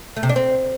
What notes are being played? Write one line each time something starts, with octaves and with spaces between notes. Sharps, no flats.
A3
C3
D4
C4